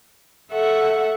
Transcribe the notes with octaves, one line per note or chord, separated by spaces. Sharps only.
A4 E5 F#5 C#6